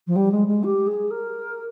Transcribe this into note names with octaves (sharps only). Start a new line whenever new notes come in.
F3
G3
G#3
G#3
G4
G#4
A#4